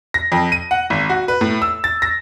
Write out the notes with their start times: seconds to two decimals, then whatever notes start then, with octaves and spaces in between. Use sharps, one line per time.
0.14 A#6
0.32 F2
0.52 D#7
0.71 F#5
0.90 G#1
1.10 F#4
1.28 B4
1.41 A2
1.62 E6
1.84 A6
2.02 A#6